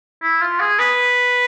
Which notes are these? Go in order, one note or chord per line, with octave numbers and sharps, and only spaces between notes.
E4
F4
G#4
B4